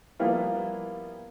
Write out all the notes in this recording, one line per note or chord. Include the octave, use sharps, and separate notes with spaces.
F3 G3 A#3 B3 E4 F4